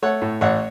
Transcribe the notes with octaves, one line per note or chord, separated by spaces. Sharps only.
A3 C#5 F#5
A2
A1 C#5 F#5